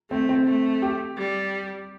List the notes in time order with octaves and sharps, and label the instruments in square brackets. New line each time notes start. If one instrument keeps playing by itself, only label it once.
[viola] A3 [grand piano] C4
[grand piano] C4
[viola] A3
[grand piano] G4
[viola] G3